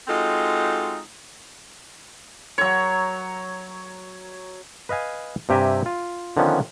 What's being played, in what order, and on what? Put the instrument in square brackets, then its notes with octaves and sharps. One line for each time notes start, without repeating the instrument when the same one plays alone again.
[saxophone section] G#3 C4 D#4 F4 F#4 A4
[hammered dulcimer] F#3 C#5
[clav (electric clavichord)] B4 D#5 F5 G#5
G2 C3 G4 E5 G#5 A#5
F4
D3 D#3 F3 B3 C#4